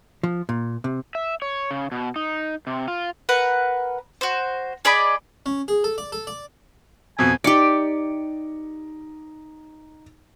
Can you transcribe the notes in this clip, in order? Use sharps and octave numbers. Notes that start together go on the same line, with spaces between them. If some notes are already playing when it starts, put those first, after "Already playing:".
F3
A#2
C3
E5
C#5
C#3
B2
D#4
C3
F4
A#4 B4 F#5
F#4 C5
G#4 D5 D#5 B5
C#4
G#4
A4
D5
A4
D5
F2 B2 G#5
D#4 G4 D5 C#7 D7